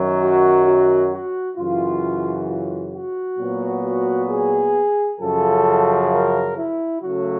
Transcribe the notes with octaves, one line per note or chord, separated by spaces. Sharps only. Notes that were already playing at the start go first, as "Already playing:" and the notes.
Already playing: F#2 D#3 F#3
F#4
F#4
F#4
F#2 C#3 E3 F4
F4
F#4
A#2 F#3 B3
F#4
G#4
F#2 C#3 F3 A4
A#4
E4
C#3 F#3 A3 F#4